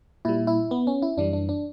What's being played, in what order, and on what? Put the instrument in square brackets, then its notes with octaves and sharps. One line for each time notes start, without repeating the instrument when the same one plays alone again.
[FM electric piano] A#2 G3 E4
E4
B3
C#4
E4
F#2 E3 G3 D4
D4
D4